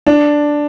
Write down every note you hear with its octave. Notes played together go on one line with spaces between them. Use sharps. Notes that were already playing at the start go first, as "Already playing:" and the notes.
D4